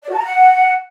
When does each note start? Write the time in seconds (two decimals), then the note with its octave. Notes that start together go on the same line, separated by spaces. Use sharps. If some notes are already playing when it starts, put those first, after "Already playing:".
0.03 D5
0.08 F#4
0.14 A5
0.19 A#5
0.24 F#5